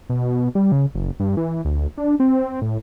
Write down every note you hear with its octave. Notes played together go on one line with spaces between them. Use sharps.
B2
G3
C#3
F#1
G2
E3
D2
D4
C4
A2